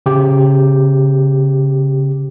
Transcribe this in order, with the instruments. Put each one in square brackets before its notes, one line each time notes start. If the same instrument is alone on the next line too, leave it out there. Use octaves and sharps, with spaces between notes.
[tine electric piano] C#3 G4